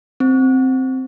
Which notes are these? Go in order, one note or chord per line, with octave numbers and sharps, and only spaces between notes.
C4